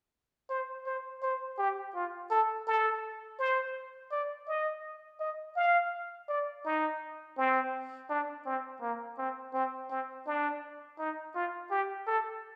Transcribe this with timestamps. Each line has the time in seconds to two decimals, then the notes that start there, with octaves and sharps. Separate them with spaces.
0.50 C5
0.86 C5
1.23 C5
1.58 G4
1.95 F4
2.31 A4
2.67 A4
3.39 C5
4.12 D5
4.48 D#5
5.20 D#5
5.56 F5
6.29 D5
6.65 D#4
7.37 C4
8.10 D4
8.46 C4
8.81 A#3
9.18 C4
9.54 C4
9.90 C4
10.27 D4
10.99 D#4
11.35 F4
11.71 G4
12.07 A4